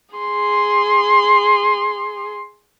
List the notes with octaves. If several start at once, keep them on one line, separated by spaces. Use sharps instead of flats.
G#4 C6